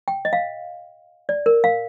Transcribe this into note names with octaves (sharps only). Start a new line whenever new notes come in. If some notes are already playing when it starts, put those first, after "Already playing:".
G5
D#5
F5
D5
A#4
F5